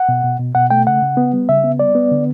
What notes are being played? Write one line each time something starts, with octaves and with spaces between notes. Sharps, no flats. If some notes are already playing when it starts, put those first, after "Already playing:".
Already playing: F#5
B2
B2
B2
B2 F#5
A3 G5
C#3 F#5
C#3
B3
G3
C#3 E5
B3
G3 D5
B3
D3